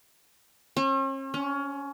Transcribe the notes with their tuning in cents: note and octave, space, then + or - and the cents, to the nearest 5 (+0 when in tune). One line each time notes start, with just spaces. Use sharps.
C#4 -45
C#4 +20